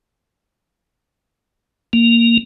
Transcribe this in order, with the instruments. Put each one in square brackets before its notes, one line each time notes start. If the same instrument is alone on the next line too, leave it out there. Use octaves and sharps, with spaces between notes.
[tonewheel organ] A#3